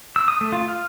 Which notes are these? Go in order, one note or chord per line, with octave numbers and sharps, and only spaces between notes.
E6
D#6
A3
F4
F5